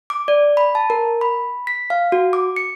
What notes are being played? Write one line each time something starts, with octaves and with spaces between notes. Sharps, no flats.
D6
D5
B5
A5
A#4
B5
B6
F5
F#4
D6
C#7